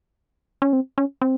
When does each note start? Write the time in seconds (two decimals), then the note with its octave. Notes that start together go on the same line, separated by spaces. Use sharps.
0.62 C#4
0.73 C4
0.98 C#4
1.22 C4